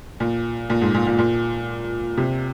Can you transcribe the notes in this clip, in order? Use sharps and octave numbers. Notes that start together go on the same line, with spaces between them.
A#2
A#2
G#2
A#2
A#2
A#2
C3